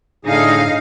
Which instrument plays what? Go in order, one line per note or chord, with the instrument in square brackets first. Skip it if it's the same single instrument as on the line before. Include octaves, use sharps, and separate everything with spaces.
[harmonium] A2 D3 G#4 [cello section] D#4 F5